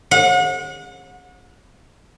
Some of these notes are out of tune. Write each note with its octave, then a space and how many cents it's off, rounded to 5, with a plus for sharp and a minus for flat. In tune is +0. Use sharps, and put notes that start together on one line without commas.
F#5 -35